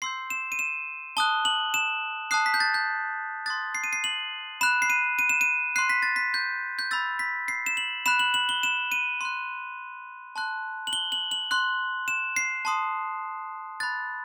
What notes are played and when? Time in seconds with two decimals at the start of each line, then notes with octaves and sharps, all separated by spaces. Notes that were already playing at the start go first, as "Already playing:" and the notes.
0.02 C6 E6 G6 C7
0.30 E7
0.52 D#7
0.59 E7
1.17 A5 D#6 F#6 G7
1.45 F#7
1.74 E7
2.31 A5 D#6 F#6 C7
2.46 B6
2.54 G6
2.60 A6
2.74 G6
3.46 C6 D#6 F#6 A6
3.75 C7
3.84 D#7
3.93 C7
4.04 F#7
4.61 B5 F#6 E7
4.82 C7
4.90 D#7
5.19 D#7
5.29 E7
5.41 D#7
5.76 C6 F#6 C7
5.89 B6
6.03 A6
6.16 B6
6.34 G6
6.79 G6
6.91 B5 E6 G6 A6
7.19 B6
7.48 C7
7.66 E7
7.77 F#7
8.06 B5 F#6 E7
8.19 F#7
8.34 F#7
8.49 G7
8.63 E7
8.92 D#7
9.21 C6 F#6
10.36 A5 C6 F#6
10.87 F#7
10.93 G7
11.12 F#7
11.31 F#7
11.51 C6 F#6
12.08 E7
12.36 C7
12.65 A5 C6 D#6
13.80 B5 F#6 A6